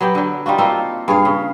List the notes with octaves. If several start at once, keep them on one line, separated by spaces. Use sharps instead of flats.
F#3 B3 G4 G5
D3 F#3
G3 D#4 F4 F#4
A#3 C4 F4 A4
G2 G#4 C#5 F5
C#3